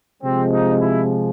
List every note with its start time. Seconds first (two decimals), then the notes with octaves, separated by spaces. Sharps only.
0.22 C3 F3 G#3 C4
0.52 D#4
0.81 E4